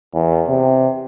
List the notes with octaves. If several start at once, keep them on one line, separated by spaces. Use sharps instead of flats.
E2
C3